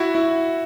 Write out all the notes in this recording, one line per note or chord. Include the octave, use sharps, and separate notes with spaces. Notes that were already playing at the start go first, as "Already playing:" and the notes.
Already playing: E4 F#4
E4